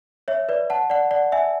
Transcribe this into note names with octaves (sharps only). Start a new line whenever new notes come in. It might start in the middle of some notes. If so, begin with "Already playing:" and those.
C#5 E5
B4 D5
F#5 A5
D5 F#5
D5 F#5
E5 G#5